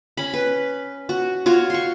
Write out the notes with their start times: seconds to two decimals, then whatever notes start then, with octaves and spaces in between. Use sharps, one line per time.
0.17 C#4 B5
0.34 B4
1.09 F#4
1.46 F4 F#4 C#5
1.70 C6 C#6